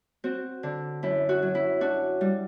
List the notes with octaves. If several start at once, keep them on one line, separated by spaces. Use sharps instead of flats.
C4 F#4
D3
F#2 E4
F#4
F#3
E4
D4 F#4
G3